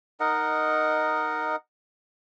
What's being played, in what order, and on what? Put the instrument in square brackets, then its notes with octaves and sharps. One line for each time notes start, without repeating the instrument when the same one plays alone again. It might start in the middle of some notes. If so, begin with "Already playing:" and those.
[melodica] D#4 A#4 D#5 F#5